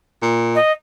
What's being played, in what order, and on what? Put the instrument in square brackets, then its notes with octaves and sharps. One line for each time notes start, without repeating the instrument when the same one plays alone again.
[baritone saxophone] A#2
[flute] D#5